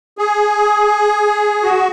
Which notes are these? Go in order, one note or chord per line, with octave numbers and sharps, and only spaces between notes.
G#4
F#4